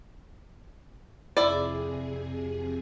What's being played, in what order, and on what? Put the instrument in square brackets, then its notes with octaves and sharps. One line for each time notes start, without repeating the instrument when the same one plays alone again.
[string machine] F2 C3 G#4 [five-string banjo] E4 D5